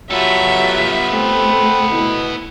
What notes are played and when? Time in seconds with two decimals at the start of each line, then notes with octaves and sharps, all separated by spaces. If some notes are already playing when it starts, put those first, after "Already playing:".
0.11 F#3 B3 F4 G4 A4 E5
1.13 A3 C4
1.91 B2 E4